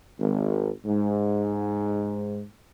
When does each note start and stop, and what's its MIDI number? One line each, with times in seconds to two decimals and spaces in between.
0.19 0.70 32
0.85 2.43 44